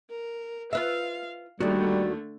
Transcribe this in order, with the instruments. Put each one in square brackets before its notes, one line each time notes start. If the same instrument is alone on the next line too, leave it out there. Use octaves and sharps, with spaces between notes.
[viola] A#4
[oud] F4 B4 E5 [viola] F5
[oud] D#2 D#3 [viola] D3 A3 [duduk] G3 [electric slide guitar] F#4 D5